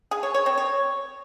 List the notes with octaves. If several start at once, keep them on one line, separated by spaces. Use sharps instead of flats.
G#4
C#5
C#5
C4
C#5